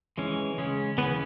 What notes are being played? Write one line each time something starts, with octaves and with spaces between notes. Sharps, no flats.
E3 G#3 C#4
C#3 G#3 C#4
C#3 E3 B3 C#4 B4